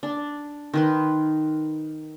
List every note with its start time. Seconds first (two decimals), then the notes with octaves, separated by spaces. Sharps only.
0.03 D4
0.74 D#3 B4 C6